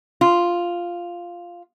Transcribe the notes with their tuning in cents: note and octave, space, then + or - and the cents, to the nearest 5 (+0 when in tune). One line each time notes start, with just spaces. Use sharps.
F4 +0